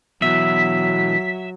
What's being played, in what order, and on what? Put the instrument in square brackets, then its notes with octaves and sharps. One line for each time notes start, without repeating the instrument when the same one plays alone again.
[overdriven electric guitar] B2 E3 [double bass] F#3 [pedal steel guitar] E5 [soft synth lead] B6